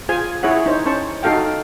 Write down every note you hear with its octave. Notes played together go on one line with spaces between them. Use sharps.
F4 G#4 C5 G#5
E4 G#4 C#5 E5 F#5
D#4 C5 C#5
C#4 C5 A5 C#6
D#4 F#4 A4 F5 G5